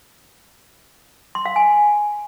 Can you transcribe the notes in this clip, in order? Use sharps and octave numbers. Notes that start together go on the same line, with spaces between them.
C6
F5
G#5